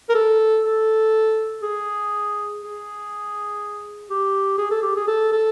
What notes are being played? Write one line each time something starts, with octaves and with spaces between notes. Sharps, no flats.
A#4
A4
A4
G#4
G#4
G4
G#4
A4
G4
G#4
A4
A4